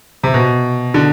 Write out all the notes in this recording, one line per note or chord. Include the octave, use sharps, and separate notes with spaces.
C3
B2
D3